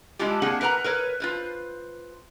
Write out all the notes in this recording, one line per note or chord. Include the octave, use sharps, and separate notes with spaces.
G#3 D4 E4 F4 G4
A#3 C4 D4 F#4 G#4 F#5
A#4 B4 F#5 A5 A#5
A#4 B4 C#5
F4 B4 C5